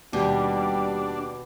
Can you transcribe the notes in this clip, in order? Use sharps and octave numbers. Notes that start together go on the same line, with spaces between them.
D#2 B2 G3 D4 G4